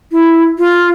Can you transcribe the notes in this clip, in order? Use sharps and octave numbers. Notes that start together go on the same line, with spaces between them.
E4
F4